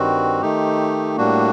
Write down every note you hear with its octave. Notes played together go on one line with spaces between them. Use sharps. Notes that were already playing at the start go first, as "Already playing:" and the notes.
Already playing: G2 D#3 G3 C4 F#4
D#3 A3 D#4 G4
A2 G3 A#3 D4 F#4